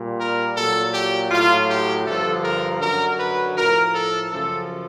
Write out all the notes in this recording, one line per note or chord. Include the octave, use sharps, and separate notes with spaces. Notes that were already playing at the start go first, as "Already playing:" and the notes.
Already playing: A#2 G3
A#4
A#2 F#3 A4
G4
A2 F#3 F4
G4
G2 D3 F3 A4
A#4
F#2 D3 F#3 A#4
B4
A2 F3 A#4
A4
F#2 C#3 F3 A4